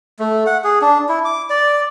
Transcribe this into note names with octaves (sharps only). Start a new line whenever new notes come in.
A3
F#5
G#4
D4
E4
D6
D5